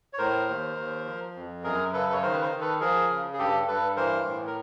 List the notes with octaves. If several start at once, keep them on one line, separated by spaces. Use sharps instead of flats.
C#5
A2 A#4 C5
D#2
D#2
F3
F2
F#2 G#4 A#4
C#3 A4 B4
C#5
D#3 A#4 C5
B4
A#4 C5
D#3
A4 B4
F3 G#4 A#4
C#3
G#4
G2 G4 A4
G2 A4 B4
E3 A#4 C5
A2
A#4